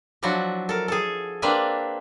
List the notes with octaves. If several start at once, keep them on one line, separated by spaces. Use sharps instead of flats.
F3 F#3 D4 E4 F#4
A4 A#4
G#4 A4
A#3 C4 D4 B4 D5 E5